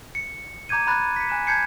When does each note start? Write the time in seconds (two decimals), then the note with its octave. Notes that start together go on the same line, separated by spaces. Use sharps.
0.15 C#7
0.69 A#5 D6 G6 G#6 D#7
0.87 A#5 B5 F#6 A6
1.16 B6 C#7
1.29 G#5 F#6 E7
1.47 A5 G6 G#6 C7 C#7